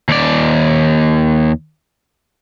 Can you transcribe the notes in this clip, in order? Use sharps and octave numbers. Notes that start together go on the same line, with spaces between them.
D#2 D5